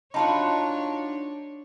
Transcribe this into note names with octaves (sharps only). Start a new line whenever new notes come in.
D4 D#4 F4 F#4 C#5 A5 B5 C6